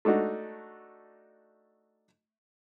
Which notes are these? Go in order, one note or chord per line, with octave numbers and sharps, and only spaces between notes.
A3 D4 D#4 F#4